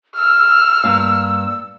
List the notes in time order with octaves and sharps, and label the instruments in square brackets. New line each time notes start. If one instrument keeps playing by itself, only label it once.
[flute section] E6 [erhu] F6
[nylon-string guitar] G2 A#3 F5